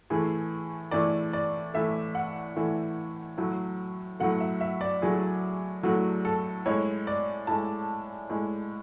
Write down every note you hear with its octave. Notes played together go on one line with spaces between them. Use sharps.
A2 E3 A3 G#4
A2 E3 A3 D5
D5
A2 E3 A3 E5
F#5
A2 E3 A3
A2 F#3 A3
A2 F#3 A3 F#5
E5
E5
D5
A2 F#3 A3 G#4
A2 F#3 A3 F#4
A4
A2 G#3 C#5
D5
A2 G#3 A5
A2 G#3